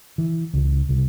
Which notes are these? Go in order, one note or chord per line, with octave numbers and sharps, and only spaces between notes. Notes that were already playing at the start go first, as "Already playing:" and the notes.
E3
C#2
C2